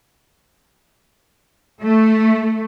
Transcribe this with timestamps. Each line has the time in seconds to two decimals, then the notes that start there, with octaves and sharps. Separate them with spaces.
1.82 A3